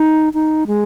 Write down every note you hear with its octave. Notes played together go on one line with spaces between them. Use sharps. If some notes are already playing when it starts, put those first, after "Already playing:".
Already playing: D#4
D#4
G#3